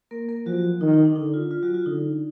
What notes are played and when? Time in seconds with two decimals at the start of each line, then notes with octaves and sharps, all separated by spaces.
0.11 A#3 A#4
0.29 A#3 A#4
0.46 F3 F#3 F#4
0.81 D#3 D#4
0.93 D#4
1.05 D4
1.16 D3 D#4
1.34 F4
1.51 F4
1.62 F#3 F#4
1.74 F4
1.86 D3 D#4